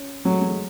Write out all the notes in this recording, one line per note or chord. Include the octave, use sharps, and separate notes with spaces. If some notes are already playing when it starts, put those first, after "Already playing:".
Already playing: C#4
F#3 A3
G#3
A3
G#3